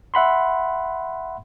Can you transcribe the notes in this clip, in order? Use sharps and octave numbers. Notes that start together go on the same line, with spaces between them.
E5 F#5 B5 C6